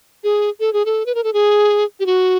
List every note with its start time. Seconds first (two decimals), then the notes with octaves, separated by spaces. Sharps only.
0.24 G#4
0.60 A4
0.73 G#4
0.86 A4
1.06 B4
1.15 A#4
1.24 A4
1.33 G#4
2.00 G4
2.06 F#4